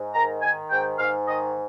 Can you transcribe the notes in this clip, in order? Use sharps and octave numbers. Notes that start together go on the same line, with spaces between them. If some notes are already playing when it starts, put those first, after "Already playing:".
Already playing: G#2
D#3 A#5
D#3 G#5
G#2 G5
G#2 F5
D#3 D#5